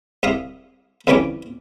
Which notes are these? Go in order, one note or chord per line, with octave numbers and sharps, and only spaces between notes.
C2 E5 F5 D#6
F2 E3 G3 C#4 C#5 D6